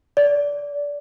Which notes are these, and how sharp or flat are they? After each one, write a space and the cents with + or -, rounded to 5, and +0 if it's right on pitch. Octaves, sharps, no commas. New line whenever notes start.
D5 -20